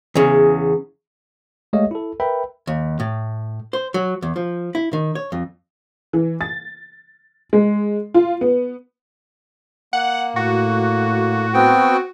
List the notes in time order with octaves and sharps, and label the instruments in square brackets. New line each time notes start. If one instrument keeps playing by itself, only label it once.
[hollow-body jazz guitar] E2 C#3
[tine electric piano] G#3 A3 G4 C#5 D#5 F5
E4 A4
A#4 B4 E5 G5 B5
[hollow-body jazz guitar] D#2
A2
C5
F#3
E2
F3
E4
D#3
C#5
F2
[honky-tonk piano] E3
A6
G#3
F4
B3
[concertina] A#3 [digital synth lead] F#5
[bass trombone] A2 [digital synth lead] F#4
[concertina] B3 C4 G5